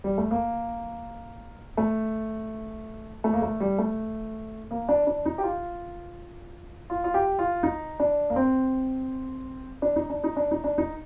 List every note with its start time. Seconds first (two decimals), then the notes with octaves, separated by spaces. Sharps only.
0.04 G3
0.18 A3
0.31 A#3
1.77 A3
3.24 A3
3.34 A#3
3.42 A3
3.60 G3
3.78 A3
4.71 A#3
4.89 D4
5.07 D4
5.25 D#4
5.38 G4
5.43 F4
6.90 F4
7.04 F4
7.14 G4
7.39 F4
7.63 D#4
8.00 D4
8.30 A#3
8.36 C4
9.82 D4
9.96 D#4
10.10 D4
10.24 D#4
10.36 D4
10.51 D#4
10.64 D4
10.78 D#4